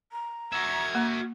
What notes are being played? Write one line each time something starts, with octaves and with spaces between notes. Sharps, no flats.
A#5
F#4 E5 G#6
A#3